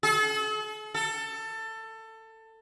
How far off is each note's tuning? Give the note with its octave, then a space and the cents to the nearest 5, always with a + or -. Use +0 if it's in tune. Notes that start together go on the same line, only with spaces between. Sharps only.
A4 -45
A4 +20